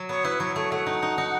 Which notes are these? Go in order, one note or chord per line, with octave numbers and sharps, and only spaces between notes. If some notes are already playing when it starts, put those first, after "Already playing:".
Already playing: F#3
B3 C#5
E4 B4
F#3 C#5
A3 C#5
A3 F#5
D#4
D#4
D#4